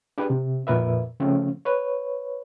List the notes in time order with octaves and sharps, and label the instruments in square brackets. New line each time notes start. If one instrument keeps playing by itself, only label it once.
[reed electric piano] D4 G4 G#4 B4
C3
F2 A#2 A#4 B4 E5
C#3 F3 A3 C4 C#4
B4 C#5